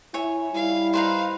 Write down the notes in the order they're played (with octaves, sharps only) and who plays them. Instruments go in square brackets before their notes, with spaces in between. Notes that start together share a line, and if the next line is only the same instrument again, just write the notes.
[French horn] E4 [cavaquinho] C#5 E5 G#5
[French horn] G3 [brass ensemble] E4 [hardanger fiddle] F5
[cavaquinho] D#4 B4 C5 [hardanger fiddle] F5